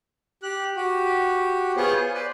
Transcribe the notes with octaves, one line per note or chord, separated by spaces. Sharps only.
G4 F#6
F#4 G4
B3 F4 G#4 C5 C#5
G#5
B4 C5 D5